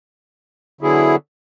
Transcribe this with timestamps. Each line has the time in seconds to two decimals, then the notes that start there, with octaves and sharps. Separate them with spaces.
0.81 D3 F#3 B3 E4 G#4